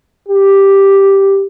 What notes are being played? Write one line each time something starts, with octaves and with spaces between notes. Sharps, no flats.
G4